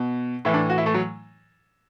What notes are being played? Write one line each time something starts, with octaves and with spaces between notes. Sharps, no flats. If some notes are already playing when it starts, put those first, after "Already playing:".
Already playing: B2
A2 E3 E4
D4
F#4
E4
A3
F#3